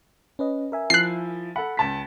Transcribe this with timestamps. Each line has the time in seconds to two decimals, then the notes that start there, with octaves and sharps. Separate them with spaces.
0.39 C#4 B4 D#5
0.72 A#4 E5 G#5
0.90 F3 E4 F#6 C7
1.56 A4 F#5 B5
1.77 C#2 A5 B6